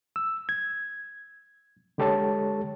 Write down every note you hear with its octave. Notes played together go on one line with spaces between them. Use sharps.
E6
G#6
D3 G#3 G4 A4 C#5 A5